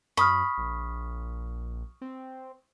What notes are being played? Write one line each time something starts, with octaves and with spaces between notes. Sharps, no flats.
F#2 B5 C#6 D#6 F6
A#1
C4